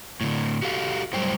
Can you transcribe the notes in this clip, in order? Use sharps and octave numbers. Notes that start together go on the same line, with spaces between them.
A2 D3
F#4 G4 A4 F5
F#2 A2 F#3 G3 C5 G5